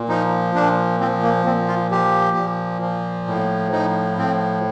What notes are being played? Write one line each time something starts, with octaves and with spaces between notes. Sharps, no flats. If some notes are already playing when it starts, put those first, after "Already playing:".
Already playing: A#2
F3 D#4
A#2 D4
F3 C4
A#3
A#2 C4
F4
F3 G4
A#2
F3
A2
F3 D#4
A2 C4